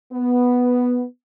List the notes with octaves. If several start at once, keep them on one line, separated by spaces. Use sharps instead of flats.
B3